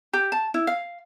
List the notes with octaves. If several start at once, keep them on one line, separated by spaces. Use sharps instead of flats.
G4
A5
E4
F5